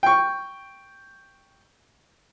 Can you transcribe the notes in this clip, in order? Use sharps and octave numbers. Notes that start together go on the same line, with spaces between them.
G5 C#6